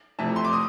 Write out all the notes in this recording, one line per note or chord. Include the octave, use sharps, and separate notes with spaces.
F2 C3 E3 A3 C4 A5
C6
D6
D#6